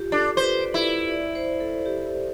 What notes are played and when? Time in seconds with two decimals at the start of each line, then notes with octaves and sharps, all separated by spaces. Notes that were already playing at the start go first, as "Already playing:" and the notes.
Already playing: F4 G4
0.12 D4 A4
0.37 B4 C5
0.61 D5
0.74 E4
1.11 D5
1.35 C5
1.60 A4
1.86 G4